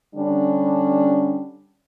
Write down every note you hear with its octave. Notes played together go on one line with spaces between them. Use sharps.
D3 G3 C#4 D4